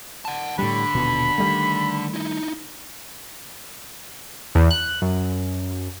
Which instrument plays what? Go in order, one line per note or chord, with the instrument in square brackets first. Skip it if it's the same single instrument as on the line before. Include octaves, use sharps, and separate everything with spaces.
[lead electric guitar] F#5 A5
[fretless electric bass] A2 G3 [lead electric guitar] D3 [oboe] B5
[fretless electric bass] D#1 B2
D#3 G3 A3
[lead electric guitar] D#4 E4
[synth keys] E2
F#6
F#2